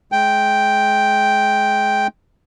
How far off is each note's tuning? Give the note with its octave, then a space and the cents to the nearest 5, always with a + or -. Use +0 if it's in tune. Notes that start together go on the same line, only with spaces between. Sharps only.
G#3 +30 G5 +0